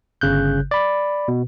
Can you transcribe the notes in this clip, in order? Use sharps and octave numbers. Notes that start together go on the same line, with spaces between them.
G1 C#3 F#6 G6
D5 B5
B2